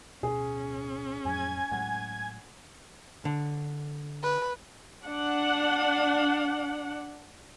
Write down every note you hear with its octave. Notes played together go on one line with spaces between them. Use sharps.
D1 B2 C#4 G#4
F2 A2 F#3 G#5 G#6
A2 F#3 G#3 F#5
D3
B4
D4 F#5